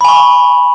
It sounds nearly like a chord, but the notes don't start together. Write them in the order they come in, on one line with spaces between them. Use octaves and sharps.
B5 G#5 C#6